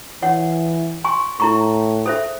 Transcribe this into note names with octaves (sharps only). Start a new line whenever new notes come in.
E3 C#5 F#5
G#5 C6 C#6
A2 E4 A#5 C#6
A4 C5 E5